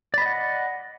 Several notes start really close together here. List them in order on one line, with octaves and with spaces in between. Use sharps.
D5 B5 D#5 F#5